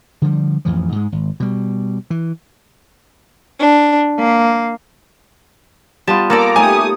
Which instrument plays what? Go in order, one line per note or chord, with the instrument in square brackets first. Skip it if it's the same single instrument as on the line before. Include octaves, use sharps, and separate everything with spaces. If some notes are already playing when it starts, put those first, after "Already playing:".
[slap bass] D3 F3 G3
A1 F2 E3 F3
G#2 G#3
G#1
B2 G3
E3
[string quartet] D4
A#3
[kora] G3 B3 F4 [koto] A5
[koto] A#3 A4 D5 [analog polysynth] A#5 D6
[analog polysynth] A3 G4 D#6 [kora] D#4 C#5 [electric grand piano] G#5